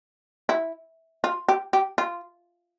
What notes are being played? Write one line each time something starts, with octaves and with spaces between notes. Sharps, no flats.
E4
F4
G4
G4
F4